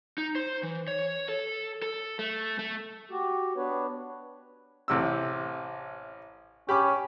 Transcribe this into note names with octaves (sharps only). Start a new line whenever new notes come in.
D#4
C5
E3
C#5
A4
A4
A3
A3
F#4 G4
B3 D4 B4 C#5
A1 C3 E6
C#4 G4 B5 D6